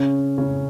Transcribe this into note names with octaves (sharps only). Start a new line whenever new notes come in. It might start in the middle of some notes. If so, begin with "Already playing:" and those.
Already playing: C#3 C#4
C#3 C#4